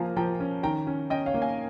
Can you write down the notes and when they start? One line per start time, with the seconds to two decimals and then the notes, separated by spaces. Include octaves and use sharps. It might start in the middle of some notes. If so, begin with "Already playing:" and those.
Already playing: F3 A#3 F5 G#5 A#5
0.17 F3 G5 A#5
0.40 C#4
0.63 D#3 G5 A#5
0.87 C#4
1.10 C#4 D#5 G5
1.26 C#5 F5
1.34 A#3
1.42 F5 G#5